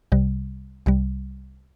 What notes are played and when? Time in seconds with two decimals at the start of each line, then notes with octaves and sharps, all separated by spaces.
0.12 C2 C3 G3
0.86 C2 C3 G3